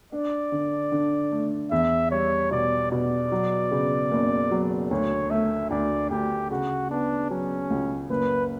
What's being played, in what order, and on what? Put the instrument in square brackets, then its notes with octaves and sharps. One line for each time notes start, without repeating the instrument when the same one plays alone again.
[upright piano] D4 [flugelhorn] D5
[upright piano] D3
D3
A3
[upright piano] E2 [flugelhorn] E5
[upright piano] G3 [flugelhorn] C#5
[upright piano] B2 [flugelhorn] D5
[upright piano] B2 [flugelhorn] D5
[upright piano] F#3
C#3
F#1
F#3
[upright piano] D2 [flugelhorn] C#5
[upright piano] A3 [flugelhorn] E5
[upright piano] D2 [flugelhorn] D5
[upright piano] D2 [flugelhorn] G4
[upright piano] C#3 [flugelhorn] F#4
[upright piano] B3 [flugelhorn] D4
[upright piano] F#3 [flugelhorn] C#4
[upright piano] C#2
[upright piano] F#1 [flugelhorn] B4